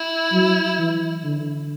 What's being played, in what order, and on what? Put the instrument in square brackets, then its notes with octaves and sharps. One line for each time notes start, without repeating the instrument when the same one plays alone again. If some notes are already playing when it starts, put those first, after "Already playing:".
Already playing: [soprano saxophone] E4
[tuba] F#3
E3
D3